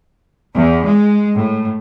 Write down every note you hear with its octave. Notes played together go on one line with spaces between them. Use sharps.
E2
G#3
A2